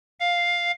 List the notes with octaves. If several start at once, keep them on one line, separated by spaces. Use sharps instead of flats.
F5